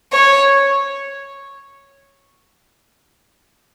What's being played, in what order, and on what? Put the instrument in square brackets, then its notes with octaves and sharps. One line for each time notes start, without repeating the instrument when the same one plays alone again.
[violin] C#5